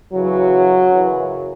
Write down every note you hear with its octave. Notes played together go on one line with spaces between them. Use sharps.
F#2 C#3 E3 F#3
F#2 C#3 E3